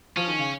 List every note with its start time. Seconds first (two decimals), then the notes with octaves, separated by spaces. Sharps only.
0.16 F3 C#4
0.28 D#3
0.39 C#3